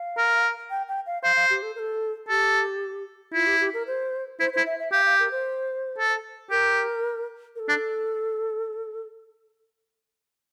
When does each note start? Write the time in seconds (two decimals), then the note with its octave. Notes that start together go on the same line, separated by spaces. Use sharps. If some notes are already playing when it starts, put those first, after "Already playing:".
Already playing: F5
0.18 A#4
0.70 G5
0.88 G5
1.06 F5
1.23 C5 F5
1.36 F5
1.50 G4
1.63 A4
1.76 A#4
1.79 A4
2.29 G4 A4
3.34 E4 F4
3.47 G4
3.60 G4
3.74 A#4
3.87 C5
4.40 E4 C5
4.53 E4 C5
4.66 E5
4.79 E5
4.92 G4 F5
5.06 F5
5.19 A#4
5.31 C5
5.99 A4
6.51 G4 A#4
7.56 A#4
7.60 A4
7.69 D4